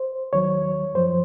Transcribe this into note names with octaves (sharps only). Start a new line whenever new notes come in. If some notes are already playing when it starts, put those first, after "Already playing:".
Already playing: C5
D#2 D#3 F#3 C#5
F#2 F3 C5